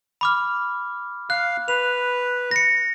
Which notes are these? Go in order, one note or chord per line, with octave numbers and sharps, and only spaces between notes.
B5 D6 F6
F5 F#6
B4 F7
A#6 C#7